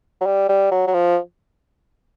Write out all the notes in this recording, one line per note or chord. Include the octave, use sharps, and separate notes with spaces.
F#3
G3
G3
F#3
F#3
F3